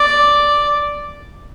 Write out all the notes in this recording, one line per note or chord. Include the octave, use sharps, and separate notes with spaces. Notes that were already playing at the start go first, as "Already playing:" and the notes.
Already playing: D5